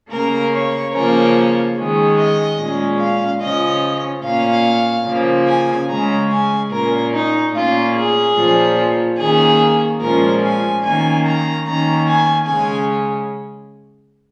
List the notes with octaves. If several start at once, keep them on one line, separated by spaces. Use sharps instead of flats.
C#3 A#3 C#4 A#4
C#5
C#3 F3 A#3 C#4 A#4
D#3 G#3 C#4
D#5
A#2 G#3 C#4
F5
C#3 F3 C#4 D#5
A#2 A#3 C#4 F5
C#3 F3 A#3
G#5
C#3 G#3 C#4 A#5
G#5
A#2 A#3 C#4 A#4
D#4
A#2 A#3 C#4 F4
G#4
A#2 F3 A#3 C#4
D#3 A#3 C#4 G#4
A#2 F3 G#3 C#4 A#4
G#5
D#3 A#3 C#4 G#5
A#5
D#3 A#3 C#4 A#5
G#5
C#3 G#3 C#4 G#5